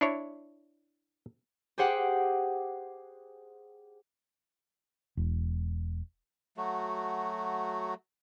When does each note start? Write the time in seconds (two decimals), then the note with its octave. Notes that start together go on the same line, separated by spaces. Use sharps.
0.01 D4 E4 C#5
1.78 G4 G#4 C5 F#5 G5 D6
5.17 E1
6.57 F#3 A3 F#4